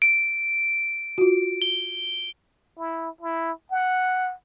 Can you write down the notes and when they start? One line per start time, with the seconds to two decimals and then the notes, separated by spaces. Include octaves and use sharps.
0.02 D7
1.18 F4 F#4
1.62 G7
2.78 E4
3.21 E4
3.71 F#5